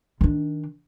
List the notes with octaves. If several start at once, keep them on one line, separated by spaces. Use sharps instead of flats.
D#3 D4